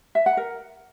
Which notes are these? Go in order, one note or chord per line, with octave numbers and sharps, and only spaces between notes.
E5
F#5
A#4